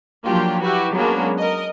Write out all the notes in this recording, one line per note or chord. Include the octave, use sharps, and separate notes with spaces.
F3 F#3 A#3 D4 F4 G4
E4 F#4 G4 B4
F#3 G#3 A#3 B3 C#4 D4
A#4 D#5